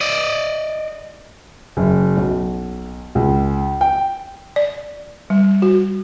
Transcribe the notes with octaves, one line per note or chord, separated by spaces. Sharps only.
D5 D#5
F#1
B1
C#2
G5
D5
G3
F#4